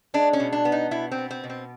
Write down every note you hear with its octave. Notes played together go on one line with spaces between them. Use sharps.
G#3 D4
C#4
B2
D4
B3
D#4
B2 E4
C4
B3
C4
B2
C4